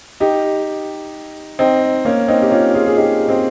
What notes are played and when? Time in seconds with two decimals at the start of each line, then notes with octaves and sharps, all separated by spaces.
0.20 D#4 G4
1.59 C4 D#4
2.05 A#3 C#4
2.28 C4 D#4
2.42 G4
2.51 C#4 F4
2.74 F4 G#4
2.86 G#4
2.97 D#4 G4
3.28 C4 D#4